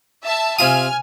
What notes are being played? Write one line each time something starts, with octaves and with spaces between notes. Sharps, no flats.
E5 A5
C3 F4 G#5 D#6 F6